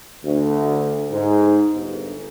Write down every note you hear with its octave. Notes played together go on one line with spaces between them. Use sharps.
D2
G#2
G1